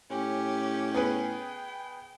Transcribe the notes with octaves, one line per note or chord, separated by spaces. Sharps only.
A2 C#4 G4
B3 G#4 B4 G5